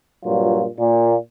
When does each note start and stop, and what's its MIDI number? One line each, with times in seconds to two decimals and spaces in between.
0.25 0.65 43
0.25 0.65 46
0.25 0.65 54
0.25 0.65 65
0.78 1.14 46